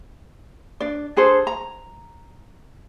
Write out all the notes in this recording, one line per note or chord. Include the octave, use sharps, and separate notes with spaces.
D4 D5
D4 G#4 A4 C5
A#5